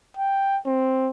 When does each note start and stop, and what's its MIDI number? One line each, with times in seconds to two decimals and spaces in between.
0.17 0.58 79
0.66 1.10 60